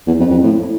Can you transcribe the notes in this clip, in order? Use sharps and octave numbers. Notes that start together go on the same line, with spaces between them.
E2
F2
F2
A2